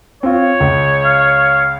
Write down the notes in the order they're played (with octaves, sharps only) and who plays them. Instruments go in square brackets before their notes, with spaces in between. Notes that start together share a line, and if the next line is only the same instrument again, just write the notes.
[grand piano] C4 F4 [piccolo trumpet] C#5
[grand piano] C#2
[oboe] F5